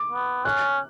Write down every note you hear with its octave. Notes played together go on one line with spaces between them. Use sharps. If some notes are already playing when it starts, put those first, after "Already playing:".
Already playing: D6
B3
C#4 F#6